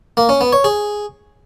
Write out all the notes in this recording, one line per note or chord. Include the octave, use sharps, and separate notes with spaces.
A#3
C#4
B3
C#5
G#4